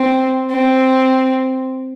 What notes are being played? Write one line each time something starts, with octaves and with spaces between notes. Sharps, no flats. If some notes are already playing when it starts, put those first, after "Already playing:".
Already playing: C4
C4